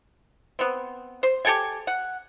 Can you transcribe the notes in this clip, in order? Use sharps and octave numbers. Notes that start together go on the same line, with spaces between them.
B3 C4
C5
G4 A4 G5 G#5
F#5